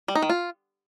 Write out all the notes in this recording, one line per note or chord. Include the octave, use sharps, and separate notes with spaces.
G3
D#4
D#3
F4